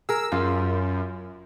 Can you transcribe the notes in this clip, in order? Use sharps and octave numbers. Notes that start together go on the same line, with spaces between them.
G#4 A#4 E6
F#2 F4